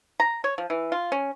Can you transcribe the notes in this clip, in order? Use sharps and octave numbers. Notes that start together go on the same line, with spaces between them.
A#5
C#5
F3
E3
F4
C#4